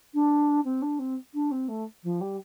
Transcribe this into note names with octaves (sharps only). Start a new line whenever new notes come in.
D4
C4
D4
C4
D4
C4
A3
F3
G3